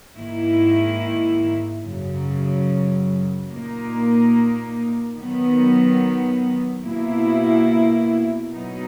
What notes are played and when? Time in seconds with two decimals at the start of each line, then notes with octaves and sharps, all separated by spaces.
0.16 G#2 D#3 A#3 E4
1.83 F#2 C#3 F#3
3.50 A#2 A#3 D#4
5.16 D#3 F#3 B3
6.83 B2 A#3 E4
8.50 B2 F#3 B3 D#4